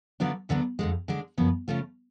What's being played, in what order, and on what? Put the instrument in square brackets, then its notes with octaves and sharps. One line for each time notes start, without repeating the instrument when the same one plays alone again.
[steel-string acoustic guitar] D3 F#3 B3 D4 F4
D2 D3 F#3 B3 D4
F2 D3 G#3
D3 G#3 D4
F#2 C#3 F3 B3
C#3 F3 A3 F4